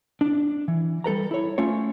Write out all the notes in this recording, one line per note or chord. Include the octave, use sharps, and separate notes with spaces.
D4
E3
G3 A4 B4 A#5
E4 C#5
A3 C#4 F4 C#5